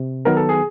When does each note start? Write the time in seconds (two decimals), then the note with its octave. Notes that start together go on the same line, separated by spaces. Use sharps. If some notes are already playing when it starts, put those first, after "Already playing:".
Already playing: C3
0.25 D#3 F#3 B3 A#4
0.37 A4
0.49 G#4